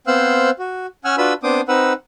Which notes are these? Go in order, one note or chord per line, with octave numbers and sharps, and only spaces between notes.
B3 C4 C5 F5 E6 F#6
F#4
C#4 F#5 G#5 E6 F6
D4 F4 F#4 B4 B5 E6
B3 C4 D4 C5 D6 D#6
C4 D#4 B4 F#5 E6